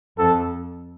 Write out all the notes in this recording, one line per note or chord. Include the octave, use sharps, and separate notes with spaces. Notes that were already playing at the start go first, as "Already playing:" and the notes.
F2 A4